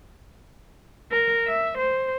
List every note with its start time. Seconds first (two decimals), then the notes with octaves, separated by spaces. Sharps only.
1.12 A#4
1.47 E5
1.78 C5